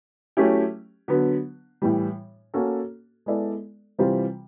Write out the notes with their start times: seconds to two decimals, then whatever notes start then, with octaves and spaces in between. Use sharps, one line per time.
0.37 F#3 A3 C#4 E4 G4
1.08 D3 F#3 B3
1.82 A2 E3 G3
2.54 A#3 C#4 F#4 A4
3.26 G#3 B3 E4 A4 D5
3.98 C3 E3 G3 C4 F4